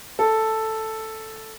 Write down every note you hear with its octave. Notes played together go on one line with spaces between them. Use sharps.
A4